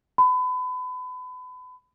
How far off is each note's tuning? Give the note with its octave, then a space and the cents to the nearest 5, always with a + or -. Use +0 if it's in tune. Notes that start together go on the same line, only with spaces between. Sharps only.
B5 +30